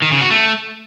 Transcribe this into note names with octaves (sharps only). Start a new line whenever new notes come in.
D#3
C#3
F#4
A3